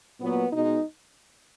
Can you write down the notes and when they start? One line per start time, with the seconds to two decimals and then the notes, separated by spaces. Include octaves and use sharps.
0.20 A#2 F#3 B3
0.52 B2 G#3 D#4